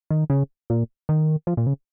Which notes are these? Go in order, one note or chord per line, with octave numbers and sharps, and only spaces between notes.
D#3
C#3
A#2
D#3
F3
A#2
C#3